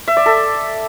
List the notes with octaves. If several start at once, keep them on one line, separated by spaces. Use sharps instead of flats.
E5
D5
A4